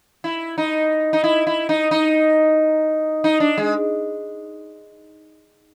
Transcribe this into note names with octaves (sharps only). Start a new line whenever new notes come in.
E4
D#4
D#4
E4
E4
D#4
D#4
D#4
D4
G#3